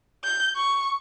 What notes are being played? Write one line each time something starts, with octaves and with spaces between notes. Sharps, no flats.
G6
C#6